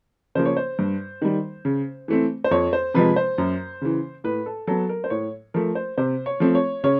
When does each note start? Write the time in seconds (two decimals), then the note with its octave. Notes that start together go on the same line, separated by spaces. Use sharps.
0.35 C#3 F3 A#3 C5
0.45 C#5
0.57 C5
0.79 G2
1.22 D#3 G3
1.65 C#3
2.08 E3 A3 C4
2.44 C5
2.51 F2 C#5
2.73 C5
2.94 C3 F3 G#3 B4
3.16 C5
3.38 F#2
3.82 C#3 E3
4.24 A2 B4
4.46 A4
4.67 F#3 B3 A4
4.89 A#4
5.04 C5
5.10 A2 C#5
5.54 F3 A3 A#4
5.75 C5
5.98 C3 C5
6.26 C#5
6.40 F3 A3 C4
6.55 C#5
6.84 C#3 C#5